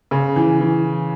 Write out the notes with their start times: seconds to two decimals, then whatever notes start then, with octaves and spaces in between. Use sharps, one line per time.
0.11 C#3
0.36 E3
0.60 E3